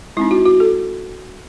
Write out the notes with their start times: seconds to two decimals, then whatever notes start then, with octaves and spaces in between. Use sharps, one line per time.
0.17 G#3 C4 D#4 E4
0.31 F#4
0.46 F#4
0.60 A4